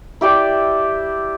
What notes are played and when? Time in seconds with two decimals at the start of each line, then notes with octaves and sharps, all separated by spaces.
0.21 E4 G4 D5 E5